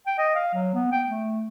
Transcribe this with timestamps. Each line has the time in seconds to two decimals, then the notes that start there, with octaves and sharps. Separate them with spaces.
0.07 G5
0.18 D#5
0.35 F5
0.54 F#3
0.74 B3
0.92 G5
1.09 A3